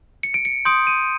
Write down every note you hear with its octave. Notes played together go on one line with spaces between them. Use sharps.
C#7
D7
C#7
C6 D#6 G6 D7
D#7